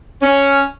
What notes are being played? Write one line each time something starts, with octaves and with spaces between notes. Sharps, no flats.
C#4